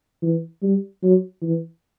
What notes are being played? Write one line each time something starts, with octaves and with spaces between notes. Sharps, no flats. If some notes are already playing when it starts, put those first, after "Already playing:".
E3
G3
F#3
E3